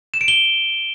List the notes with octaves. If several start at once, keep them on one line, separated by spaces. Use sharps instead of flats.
E7
D7
G7